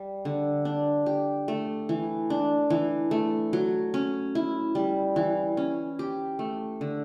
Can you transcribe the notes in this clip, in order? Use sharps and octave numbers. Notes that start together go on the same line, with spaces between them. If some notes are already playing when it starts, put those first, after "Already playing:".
Already playing: G3
D3
D4
G4
A3
E3
D4
E3
A3
F#3
C#4
E4
G3
E3
C#4
G4
A3
D3